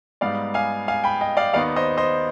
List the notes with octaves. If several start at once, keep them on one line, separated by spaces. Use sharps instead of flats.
G#2 G3 B3 D#4 D5 F5
F5 G#5
F5 G#5
G5 B5
D#5 G5
D5 F5
D#2 D#3 B3 D#4 D5 F5
C5 D#5
C5 D#5